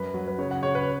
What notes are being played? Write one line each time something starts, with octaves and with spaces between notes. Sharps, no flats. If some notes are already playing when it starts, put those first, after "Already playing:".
Already playing: F#2 B4
F#3
B4
C#3 C#5
F#5
C#3 C#5
B4